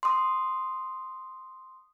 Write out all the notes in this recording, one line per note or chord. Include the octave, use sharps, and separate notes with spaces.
C6 D#6